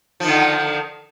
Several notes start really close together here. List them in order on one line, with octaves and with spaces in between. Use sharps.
F3 D#3 D3